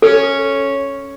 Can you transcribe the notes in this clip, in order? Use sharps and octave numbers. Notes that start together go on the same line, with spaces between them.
C#4 A4